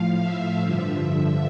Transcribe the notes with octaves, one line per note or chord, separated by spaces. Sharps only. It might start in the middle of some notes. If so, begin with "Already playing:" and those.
Already playing: A2 F3 F5
E5
G2 D3 F3